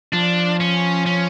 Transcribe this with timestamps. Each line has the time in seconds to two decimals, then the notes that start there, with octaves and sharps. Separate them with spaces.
0.13 F3 D4
0.60 C#4
1.06 C#4